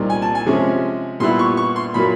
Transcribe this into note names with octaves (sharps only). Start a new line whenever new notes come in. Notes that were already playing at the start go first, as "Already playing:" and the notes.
Already playing: C2 A#2 G3 A#3 D#4
G#5
A5
G#5
C3 F3 G#3 C#4
A#2 G3 B3 E4 C6
C#6
C#6
C6
A#2 F#3 A#3 B5